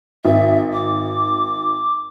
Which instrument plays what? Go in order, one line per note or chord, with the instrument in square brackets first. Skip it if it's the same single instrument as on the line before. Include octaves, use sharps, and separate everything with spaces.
[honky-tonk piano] G#1 [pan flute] E5
[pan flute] D6